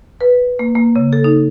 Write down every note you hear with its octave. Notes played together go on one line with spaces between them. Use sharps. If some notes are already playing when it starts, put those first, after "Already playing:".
B4
A#3
A#3
C#3
A4
D#4